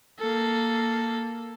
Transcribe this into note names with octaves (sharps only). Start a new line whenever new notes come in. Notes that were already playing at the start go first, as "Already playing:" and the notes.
A#3 A4